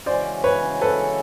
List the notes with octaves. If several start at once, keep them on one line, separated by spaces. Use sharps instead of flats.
C#3 E3 G#3 C#4 F#4 C5 D5
B4 C#5
A4 B4